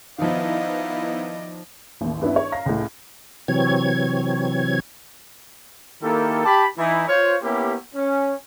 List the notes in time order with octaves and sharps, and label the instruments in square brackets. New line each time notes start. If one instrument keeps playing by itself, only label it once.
[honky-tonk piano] D#3 F3 [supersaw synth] B3 D#4 E4 [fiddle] D5 D#5 [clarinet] F5
[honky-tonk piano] A1 D#2
G2 B3 C#4 D4 E4
C#5
F5 A#5 A#6
C#2 A2
[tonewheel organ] C3 E3 F#3 C4 C#5 G#6
[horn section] D#3 A#3 E4 G4 A4
G4 A5 B5
E3 D#4 E4
F4 C5 C#5
A#3 B3 C#4 E4 G4
C#4